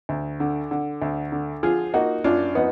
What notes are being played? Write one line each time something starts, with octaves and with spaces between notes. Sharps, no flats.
D2
D3
D3
D2
D3
F3 F4 G#4
A#3 D#4 F#4
F#2 D4 F4
F3 B3 D#4